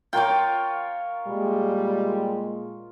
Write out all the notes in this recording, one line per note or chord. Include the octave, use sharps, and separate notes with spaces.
F4 A#4 C#5 G5 D6
A#2 G3 G#3